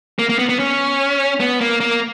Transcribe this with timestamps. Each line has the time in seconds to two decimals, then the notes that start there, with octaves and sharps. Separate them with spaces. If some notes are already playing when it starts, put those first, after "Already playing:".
0.19 A#3
0.29 A#3
0.39 B3
0.49 B3
0.59 C#4
1.40 B3
1.61 A#3
1.80 A#3